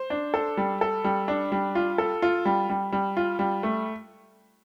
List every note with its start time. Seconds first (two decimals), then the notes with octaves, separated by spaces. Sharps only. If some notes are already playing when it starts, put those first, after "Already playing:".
Already playing: C5
0.10 D4
0.34 A4
0.57 G3
0.81 A4
1.04 G3
1.28 D4
1.52 G3
1.75 F4
1.98 A4
2.22 F4
2.45 G3
2.69 G3
2.92 G3
3.17 F4
3.39 G3
3.63 A3